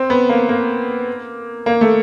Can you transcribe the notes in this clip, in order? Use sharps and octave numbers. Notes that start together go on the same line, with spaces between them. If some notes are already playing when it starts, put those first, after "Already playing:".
Already playing: C4
B3
A#3
A#3
A#3
A3